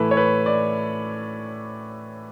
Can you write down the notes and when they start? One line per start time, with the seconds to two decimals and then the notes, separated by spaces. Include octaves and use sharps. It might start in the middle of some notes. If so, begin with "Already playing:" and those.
Already playing: A2 E3 A3 E4 A4 B4
0.11 C#5
0.17 B4
0.46 D5